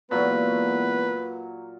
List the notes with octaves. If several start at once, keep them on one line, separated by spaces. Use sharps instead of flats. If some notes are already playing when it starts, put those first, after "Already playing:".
A#2 E3 F#3 G#3 B3 B4